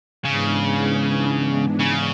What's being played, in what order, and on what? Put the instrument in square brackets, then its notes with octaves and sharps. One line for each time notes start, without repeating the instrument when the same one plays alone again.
[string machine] G#2 E3 G#3 B3 D4 [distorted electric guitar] C#3
[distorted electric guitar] C#3